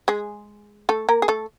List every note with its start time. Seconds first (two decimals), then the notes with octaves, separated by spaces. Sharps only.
0.08 G#3 G#4
0.89 A3 A4
1.09 A#3 A#4
1.22 G#4
1.28 A3 A4